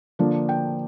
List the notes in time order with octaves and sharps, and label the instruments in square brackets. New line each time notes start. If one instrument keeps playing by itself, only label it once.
[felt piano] D3 F3 A#3 D4
G5